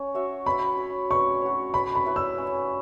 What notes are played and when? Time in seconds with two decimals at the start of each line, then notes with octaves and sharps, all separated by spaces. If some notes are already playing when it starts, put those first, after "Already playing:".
Already playing: C#4
0.14 F#4 C#5 E5
0.46 C#4 B5
0.77 F#4 C#5
1.10 C#4 C#6
1.41 F#4 C#5
1.74 C#4 B5
1.95 B5
2.06 E4 B4 E5
2.16 E6
2.38 C#4